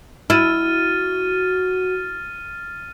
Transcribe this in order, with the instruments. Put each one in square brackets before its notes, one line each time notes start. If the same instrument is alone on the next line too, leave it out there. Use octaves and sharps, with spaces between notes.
[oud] E4 [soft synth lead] F#4 [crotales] F6 A6 D#7